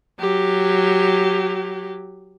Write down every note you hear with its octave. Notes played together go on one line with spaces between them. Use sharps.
F#3 G4